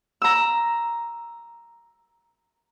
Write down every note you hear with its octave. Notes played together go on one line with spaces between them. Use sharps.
A#5 E6